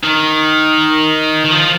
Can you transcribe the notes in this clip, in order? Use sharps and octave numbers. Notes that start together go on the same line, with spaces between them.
D#3
D#3
F3